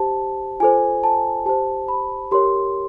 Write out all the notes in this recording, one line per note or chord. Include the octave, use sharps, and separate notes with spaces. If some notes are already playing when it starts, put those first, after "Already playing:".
Already playing: G4 C5 A5
F4 A4 C5 G#5
A5
G4 C5 A5
B5
G4 A#4 C#5 C6